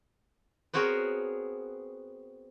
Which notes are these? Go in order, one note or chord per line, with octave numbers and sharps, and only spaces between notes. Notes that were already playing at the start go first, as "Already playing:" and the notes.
B3 C4 F#4 G#4 A#4 C#5